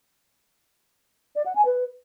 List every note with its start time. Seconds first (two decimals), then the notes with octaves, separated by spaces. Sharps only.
1.36 D5
1.46 F#5
1.55 G#5
1.65 B4